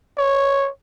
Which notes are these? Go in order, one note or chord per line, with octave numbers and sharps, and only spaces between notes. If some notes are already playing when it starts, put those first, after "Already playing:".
C#5